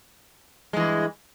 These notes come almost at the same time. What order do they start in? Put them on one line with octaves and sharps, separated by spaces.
G#3 E3 G2